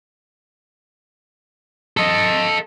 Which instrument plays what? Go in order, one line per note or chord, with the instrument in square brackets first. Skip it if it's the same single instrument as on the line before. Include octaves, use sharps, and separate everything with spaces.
[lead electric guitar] A4 D#5